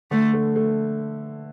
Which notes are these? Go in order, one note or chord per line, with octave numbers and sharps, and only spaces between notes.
D3 A3
A3
A3